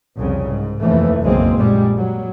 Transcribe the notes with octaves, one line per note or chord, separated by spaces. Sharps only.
C2 F2 C#3
G#2
F1 D#2 E3 F3 A3
F#1 B1 G#3 A#3 C4
A#1 G3 G#3
F#3